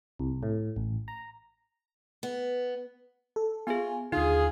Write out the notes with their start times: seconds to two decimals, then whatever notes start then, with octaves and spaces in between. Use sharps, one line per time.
0.19 C2
0.43 A2
0.76 A1
1.08 A#5
2.23 B3
3.36 A4
3.67 B3 F4 G#4 G#5
4.12 D#2 D3 D#4 F4 G#4